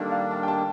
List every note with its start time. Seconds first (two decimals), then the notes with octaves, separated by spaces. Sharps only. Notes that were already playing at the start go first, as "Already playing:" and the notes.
Already playing: D#3 G3 A#3 D4 A4 A#4
0.12 F5
0.31 A5
0.43 G5
0.48 A5